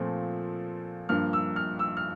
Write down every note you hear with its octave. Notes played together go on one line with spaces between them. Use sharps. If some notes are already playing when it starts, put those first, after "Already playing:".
Already playing: A#2 F3 A3 C4
G2 F3 A#3 F6
E6
F6
E6
F6